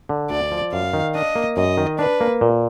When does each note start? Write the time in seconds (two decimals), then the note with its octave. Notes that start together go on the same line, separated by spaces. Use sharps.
0.09 D3
0.30 D2 D5
0.51 F3
0.72 F#2 F5
0.93 D#3
1.15 D4 D#5
1.35 A#3
1.57 F#2 D#5
1.77 D#3
1.99 D4 B4
2.21 A#3
2.41 A#2